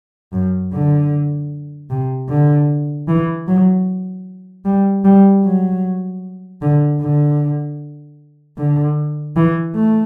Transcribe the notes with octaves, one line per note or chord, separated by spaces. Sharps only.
F#2
D3
C3
D3
E3
F#3
G3
G3
F#3
D3
D3
D3
E3
A3